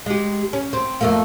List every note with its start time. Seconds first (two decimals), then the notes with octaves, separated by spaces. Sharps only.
0.06 G#3 G4
0.53 C#4
0.73 C4
1.01 F2 A3 A#3